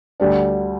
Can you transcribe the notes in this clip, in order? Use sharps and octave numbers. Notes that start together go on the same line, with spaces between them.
D2 D3 G3 D4